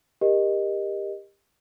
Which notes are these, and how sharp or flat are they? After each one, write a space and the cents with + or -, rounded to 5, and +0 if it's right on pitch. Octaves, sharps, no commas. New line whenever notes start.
G4 +25 A#4 +20 D#5 -15